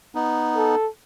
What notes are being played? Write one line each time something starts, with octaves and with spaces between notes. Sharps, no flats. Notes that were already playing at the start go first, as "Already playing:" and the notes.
B3 D#4
A4